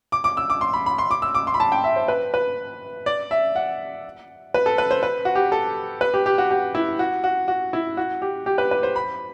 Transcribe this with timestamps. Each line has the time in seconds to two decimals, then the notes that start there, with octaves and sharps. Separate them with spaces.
0.12 D6
0.24 D6
0.37 E6
0.50 D6
0.61 C6
0.73 B5
0.86 B5
0.98 C6
1.11 D6
1.22 E6
1.35 D6
1.47 C6
1.54 B5
1.60 A5
1.72 G5
1.84 E5
1.96 C5
2.08 B4
2.34 B4
3.06 D5
3.31 E5
3.56 F#5
4.54 B4
4.66 A4
4.78 B4
4.91 C5
5.03 B4
5.25 F#4
5.35 G4
5.52 A4
6.01 B4
6.14 G4
6.26 G4
6.38 F#4
6.51 G4
6.75 E4
6.99 F#4
7.24 F#4
7.48 F#4
7.73 E4
7.97 F#4
8.22 G4
8.46 G4
8.58 B4
8.71 B4
8.83 C5
8.96 B5